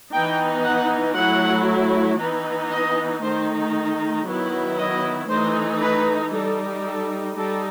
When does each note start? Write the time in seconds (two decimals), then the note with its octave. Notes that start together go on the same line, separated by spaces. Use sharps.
0.12 E3 B3 D#4 G5
0.64 F#5
1.16 F#3 A3 E4 F#5
2.19 E3 B3 D#4
2.71 D#5
3.22 D#3 A3 D#4 C5
4.26 D#3 F#3 B3 E4
4.78 D#5
5.30 E3 A3 D#4 C5
5.82 B4
6.33 G3 D#4 A4
6.85 A4
7.37 G3 D#4 A4